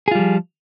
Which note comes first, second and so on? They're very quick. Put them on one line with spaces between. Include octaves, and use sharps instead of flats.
G#4 F4 G3 F3